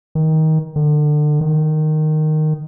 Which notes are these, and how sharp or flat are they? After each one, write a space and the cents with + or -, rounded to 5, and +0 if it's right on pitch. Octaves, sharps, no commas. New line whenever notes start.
D#3 +20
D3 +30
D#3 -10